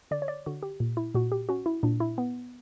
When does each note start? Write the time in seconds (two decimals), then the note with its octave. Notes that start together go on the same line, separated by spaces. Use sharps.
0.11 D3 D5
0.22 C#5
0.28 D5
0.46 D3 F#4
0.63 G4
0.80 A#2
0.97 E4
1.15 A#2 F#4
1.32 G4
1.49 C#4 F#4
1.66 E4
1.83 A#2 D4
2.00 E4
2.18 B3